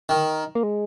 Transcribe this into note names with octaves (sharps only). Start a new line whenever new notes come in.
D#3
A#3
G#3